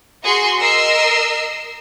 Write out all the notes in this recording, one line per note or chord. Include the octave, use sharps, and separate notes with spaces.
F#4 G#4 C6
A#4 D#5 E6 C7